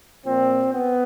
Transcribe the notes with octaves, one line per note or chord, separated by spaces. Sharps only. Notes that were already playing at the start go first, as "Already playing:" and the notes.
A#2 F3 C4
B3